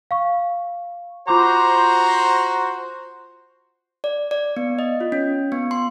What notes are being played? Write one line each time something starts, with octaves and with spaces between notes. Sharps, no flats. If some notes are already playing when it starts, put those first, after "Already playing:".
F5 C#6
F4 F#4 C5 A#5 D6
D5
D5
B3
D#5
F4
C#4
B3
C6